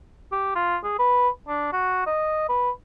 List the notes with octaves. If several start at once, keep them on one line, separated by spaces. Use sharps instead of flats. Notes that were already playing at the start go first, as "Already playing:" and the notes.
G4
F4
G#4
B4
D4
F#4
D#5
B4